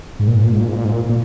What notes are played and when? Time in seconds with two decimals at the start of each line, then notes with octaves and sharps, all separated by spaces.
0.19 G#2
0.28 A#2
0.36 G#2
0.44 A#2
0.52 G#2
0.61 A#2
0.68 G#2
0.77 A#2
0.85 G#2
0.93 A#2
1.09 A#2